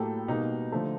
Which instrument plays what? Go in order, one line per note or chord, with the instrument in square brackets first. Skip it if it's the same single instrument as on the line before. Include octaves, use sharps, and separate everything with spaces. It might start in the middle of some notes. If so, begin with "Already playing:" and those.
Already playing: [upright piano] A2 F#3 A#3 G4 A4
B2 G3 A#3 D#4
D3 F3 A3